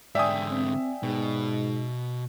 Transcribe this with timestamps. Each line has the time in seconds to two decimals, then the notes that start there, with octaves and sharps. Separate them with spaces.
0.15 G#2 D3 D5 E5 G5 G#5 D#6
0.51 C4
1.03 G#2 B2